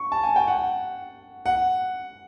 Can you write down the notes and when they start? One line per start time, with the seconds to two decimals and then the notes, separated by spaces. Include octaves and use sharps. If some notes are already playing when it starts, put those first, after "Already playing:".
Already playing: C#6
0.12 A5
0.23 G#5
0.36 G5
0.47 F#5
1.46 F#5